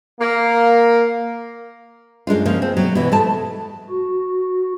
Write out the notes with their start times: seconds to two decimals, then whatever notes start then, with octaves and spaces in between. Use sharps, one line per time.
0.20 A#3
2.27 F#2 G#3 D4 F4
2.46 C#3 F3 A#3
2.62 C4
2.77 B2 F#3
2.95 B2 E3
3.12 G#2 A3 A5
3.89 F#4